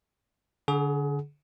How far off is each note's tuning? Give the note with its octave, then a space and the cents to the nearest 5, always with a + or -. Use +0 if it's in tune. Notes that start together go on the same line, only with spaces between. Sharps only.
D3 -20 G#4 +30 F#5 +0